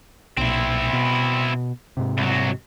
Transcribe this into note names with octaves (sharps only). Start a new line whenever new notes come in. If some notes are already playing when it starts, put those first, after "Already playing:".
B1 A#2 C4 E4
B2
G#2 C3
C2 F#3